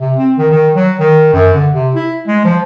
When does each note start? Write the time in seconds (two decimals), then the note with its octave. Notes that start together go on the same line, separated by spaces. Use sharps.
0.01 C3
0.17 C4
0.38 D#3
0.51 D#3
0.75 F#3
0.99 D#3
1.33 F#2
1.54 D3
1.73 C3
1.95 E4
2.28 G#3
2.45 F3